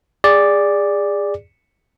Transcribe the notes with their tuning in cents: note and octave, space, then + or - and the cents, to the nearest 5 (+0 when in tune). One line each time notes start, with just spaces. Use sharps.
G#4 -25 D5 +0